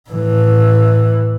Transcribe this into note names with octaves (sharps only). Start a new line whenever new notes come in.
A2 E3